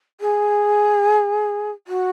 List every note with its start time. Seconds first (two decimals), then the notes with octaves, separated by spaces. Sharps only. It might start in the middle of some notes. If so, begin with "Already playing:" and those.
0.21 G#4
1.88 F#4